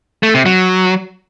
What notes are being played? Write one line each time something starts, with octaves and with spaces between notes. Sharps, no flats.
A3
C3
F#3